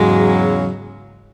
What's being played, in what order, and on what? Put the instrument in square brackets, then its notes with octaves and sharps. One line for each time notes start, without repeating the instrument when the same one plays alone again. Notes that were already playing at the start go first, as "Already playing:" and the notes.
Already playing: [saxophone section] E2 C#3 F#3 [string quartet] G#2 G#3